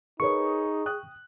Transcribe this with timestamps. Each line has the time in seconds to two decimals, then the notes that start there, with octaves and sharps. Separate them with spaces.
0.20 D#4 G#4 A#4 B4 C#5 C#6
0.86 G5 D#6 F#6